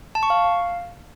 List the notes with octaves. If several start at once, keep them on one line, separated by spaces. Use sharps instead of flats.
A5
C#6
F5